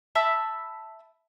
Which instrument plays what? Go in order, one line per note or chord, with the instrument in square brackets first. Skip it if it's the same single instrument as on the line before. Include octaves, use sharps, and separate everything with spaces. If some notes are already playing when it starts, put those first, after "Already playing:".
[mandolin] E5 A5 B5 E6